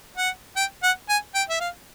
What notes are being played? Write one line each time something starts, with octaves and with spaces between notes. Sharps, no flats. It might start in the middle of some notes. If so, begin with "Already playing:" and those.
F#5
G5
F#5
G#5
G5
E5
F5